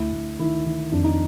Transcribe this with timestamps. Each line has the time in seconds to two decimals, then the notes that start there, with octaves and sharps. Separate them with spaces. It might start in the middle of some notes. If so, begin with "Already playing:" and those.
Already playing: D2 E4
0.12 D2
0.39 D#3 E4
0.66 D#3
0.92 F2 D4
1.04 D#4